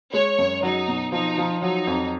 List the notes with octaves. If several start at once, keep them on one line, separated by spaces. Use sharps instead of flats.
G#3 C#5
F#2
F#3 D#4
B2
F3 D#4
F3
F#3 D#4
F2